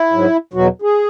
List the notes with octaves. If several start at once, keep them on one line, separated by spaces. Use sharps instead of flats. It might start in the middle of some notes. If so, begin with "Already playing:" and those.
Already playing: E4
G#2 F#3
E2 B2 F#3 F#4
G#4